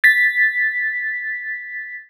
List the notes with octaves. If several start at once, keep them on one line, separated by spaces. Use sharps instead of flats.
A6 B6